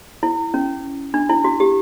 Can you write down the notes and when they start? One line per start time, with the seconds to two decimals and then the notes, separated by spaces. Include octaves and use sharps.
0.23 E4
0.54 C#4
1.14 D4
1.29 E4
1.44 F#4
1.60 G4